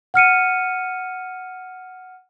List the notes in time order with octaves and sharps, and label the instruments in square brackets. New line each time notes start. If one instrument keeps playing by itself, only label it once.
[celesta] F#5 F6 C#7 D#7